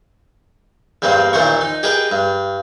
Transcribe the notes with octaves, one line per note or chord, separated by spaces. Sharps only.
E2 G2 G3 A#3 C4
D#2 A#2 E3 C5 A#5 C#6
D#4
G4 G#4 A#4 B4 D#5
G2